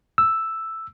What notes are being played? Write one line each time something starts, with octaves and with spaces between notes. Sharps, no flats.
E6